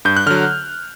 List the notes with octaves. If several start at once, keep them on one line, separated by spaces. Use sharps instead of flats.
G2 G6
F#6
D3 F#3 F6